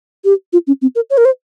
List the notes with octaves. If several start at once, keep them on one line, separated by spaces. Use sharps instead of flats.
G4
F4
C#4
C4
A#4
C#5
A#4
C5